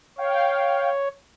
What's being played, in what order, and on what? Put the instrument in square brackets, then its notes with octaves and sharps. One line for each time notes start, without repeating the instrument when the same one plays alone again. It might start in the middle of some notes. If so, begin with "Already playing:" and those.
[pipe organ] C#5 [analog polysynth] F5 G5